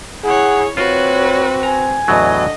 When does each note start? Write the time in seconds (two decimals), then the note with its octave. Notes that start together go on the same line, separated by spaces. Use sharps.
0.24 E4 G#4 C#5 F#5
0.77 C4 F4 F#4 B4 C#5
1.63 G#5 A#5
2.08 E2 A2 D3 F#3 D#5